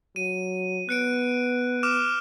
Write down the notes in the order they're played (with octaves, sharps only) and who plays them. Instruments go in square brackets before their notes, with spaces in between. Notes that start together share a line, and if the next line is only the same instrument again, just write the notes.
[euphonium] F#3 [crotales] D#7
[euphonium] B3 [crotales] F#6 C#7 D7
[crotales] D6 F6 E7